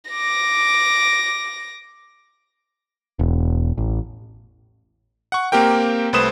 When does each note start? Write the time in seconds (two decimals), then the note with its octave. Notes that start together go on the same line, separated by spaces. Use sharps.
0.10 D6 A#6
3.19 E1
3.78 A1
5.32 F#5 C#6
5.52 A#3 C4 G4 A#4 G5
6.13 C2 A3 B4 C5 D#6 E7